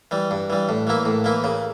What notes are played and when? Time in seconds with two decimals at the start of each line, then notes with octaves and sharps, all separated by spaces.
0.11 E3 G3
0.31 G2
0.50 E3 G3
0.69 A2
0.87 E3 A#3 E4
1.05 A2
1.24 E3 A#3 E4
1.44 C#3